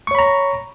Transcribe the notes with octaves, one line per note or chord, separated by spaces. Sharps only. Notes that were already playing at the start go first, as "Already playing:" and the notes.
C#5 A#5 B5 C#6